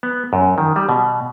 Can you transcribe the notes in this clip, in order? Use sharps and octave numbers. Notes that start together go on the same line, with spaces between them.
B3
F#2
D#3
G3
B2